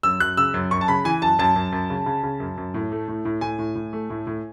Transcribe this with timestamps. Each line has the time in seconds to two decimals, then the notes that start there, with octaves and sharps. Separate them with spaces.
0.03 F#2 E6
0.20 F#2 F#6
0.37 C#3 E6
0.54 F#2
0.71 F#2 C#6
0.81 A5
0.88 C#3 B5
1.05 E3 G#5
1.22 F#2 A5
1.39 F#2 A5
1.56 F#2
1.72 F#2
1.90 C#3
2.06 C#3
2.23 C#3
2.40 F#2
2.57 F#2
2.74 A2
2.92 A3
3.08 A2
3.25 A2
3.41 A2 G#5
3.59 A2
3.75 A2
3.93 A3
4.10 A2
4.27 A2